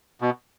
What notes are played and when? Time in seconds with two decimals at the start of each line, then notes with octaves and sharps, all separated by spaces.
0.21 B2